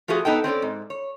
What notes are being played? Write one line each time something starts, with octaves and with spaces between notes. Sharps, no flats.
F3 A3 F4 F#4 G#4
B3 D#4 A4 G5
C4 C#4 A4 D5
G#2
C#5